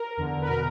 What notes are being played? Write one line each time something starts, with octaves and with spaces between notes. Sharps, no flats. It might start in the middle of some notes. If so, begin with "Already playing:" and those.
Already playing: A#4
E2 D3
B4
B2 A#4